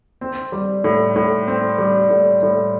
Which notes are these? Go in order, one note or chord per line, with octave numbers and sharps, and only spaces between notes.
C4
G3
A2
A2
C4
G3
A2
A2